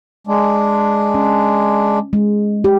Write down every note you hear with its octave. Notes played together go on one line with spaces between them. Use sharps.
G#3 D4
C#4
G#3
G4